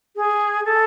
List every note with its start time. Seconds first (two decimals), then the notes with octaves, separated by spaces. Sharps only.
0.16 G#4
0.65 A4